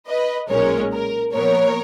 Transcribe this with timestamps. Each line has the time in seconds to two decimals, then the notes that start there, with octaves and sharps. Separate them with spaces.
0.08 B4 D#5
0.49 B1 A#2 G#3 C#4 A#4 C#5
0.92 A#4
1.34 A#2 F3 B3 A#4 C#5